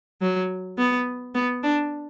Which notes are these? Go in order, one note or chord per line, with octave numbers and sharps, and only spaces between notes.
F#3
B3
B3
D4